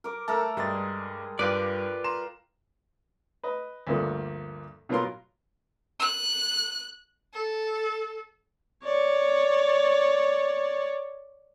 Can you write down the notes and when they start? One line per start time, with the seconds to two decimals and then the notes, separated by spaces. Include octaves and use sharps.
0.04 A#4 D6
0.28 A3 A4 A#4 A5 A#5 E6
0.57 G2 G3 G#3 G#4 A6
1.39 G2 F4 G4 B4 D5
2.04 A#5 C6 E7
3.43 B4 D#5
3.87 D2 G2 D3 F3 A#3
4.89 B2 F#3 A#3 F4 A#4 C6
5.99 F#6
7.33 A4
8.84 C#5 D5